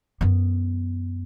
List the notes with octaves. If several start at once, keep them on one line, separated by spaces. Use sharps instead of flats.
F#2 B3